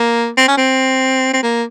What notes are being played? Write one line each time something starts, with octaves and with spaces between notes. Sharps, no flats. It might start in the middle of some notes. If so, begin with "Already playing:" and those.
Already playing: A#3
C4
C#4
C4
C4
A#3